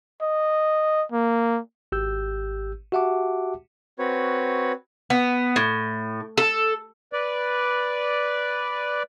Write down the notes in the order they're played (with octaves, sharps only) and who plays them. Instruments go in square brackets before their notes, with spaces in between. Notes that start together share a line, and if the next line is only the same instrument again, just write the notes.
[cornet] D#5
A#3
[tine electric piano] G#1 G4 E6 G6
F#4 G4 E5 F#5 A5 D6
[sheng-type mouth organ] C4 F#4 B4 C#5
[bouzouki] B3
A2
A4
[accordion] B4 D5